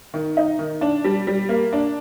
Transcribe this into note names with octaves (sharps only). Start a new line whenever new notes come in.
D#3
D#4
D#3
D4
G3
G3
A#3
D4